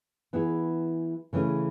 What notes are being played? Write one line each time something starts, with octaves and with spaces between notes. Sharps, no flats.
E3 B3 E4 G#4
C#3 E3 A3 C#4 G#4